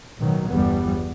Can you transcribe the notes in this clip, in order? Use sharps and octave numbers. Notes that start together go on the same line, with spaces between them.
A1 B2 D#3 F#3
G1 E2 G3 B3